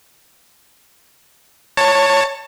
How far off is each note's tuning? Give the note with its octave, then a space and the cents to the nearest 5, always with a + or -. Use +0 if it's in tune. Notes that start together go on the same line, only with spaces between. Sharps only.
C#5 +0 A5 +25